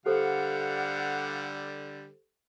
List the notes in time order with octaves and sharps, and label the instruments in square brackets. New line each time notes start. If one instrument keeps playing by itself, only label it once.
[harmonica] D3 G3 [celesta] G4 A4 C5 [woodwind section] F5 F#5